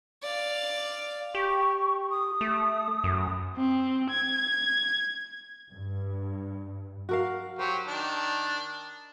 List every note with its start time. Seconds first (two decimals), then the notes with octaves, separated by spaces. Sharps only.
0.22 D5 F5
1.35 G4 C#6
2.10 D#6
2.41 A3
3.04 F#2
3.57 C4
4.10 G#6
5.71 G2
7.09 F#4 A#4 F5
7.59 F#3 G4 C5
7.88 D#3 D4